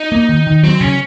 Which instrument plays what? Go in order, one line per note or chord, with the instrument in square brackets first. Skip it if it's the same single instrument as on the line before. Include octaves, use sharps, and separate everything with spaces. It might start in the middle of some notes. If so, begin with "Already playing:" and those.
Already playing: [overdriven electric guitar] D#4
[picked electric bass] A#3
D#3
D#3
[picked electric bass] F#3 [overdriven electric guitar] C4
[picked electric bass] C#3 [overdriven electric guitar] C#4